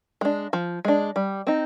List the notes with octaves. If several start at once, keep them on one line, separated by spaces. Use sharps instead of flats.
G#3 D4
F3
G#3 D4
G3
C4 D#4